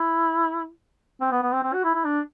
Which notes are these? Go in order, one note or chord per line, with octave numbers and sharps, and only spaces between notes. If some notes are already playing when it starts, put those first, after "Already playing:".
Already playing: E4
C4
B3
B3
C4
C4
F#4
E4
E4
D4